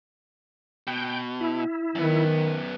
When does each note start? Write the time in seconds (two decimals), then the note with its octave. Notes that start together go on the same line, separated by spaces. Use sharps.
0.87 B2 G5
1.41 E4
1.95 F#2 D#3 B3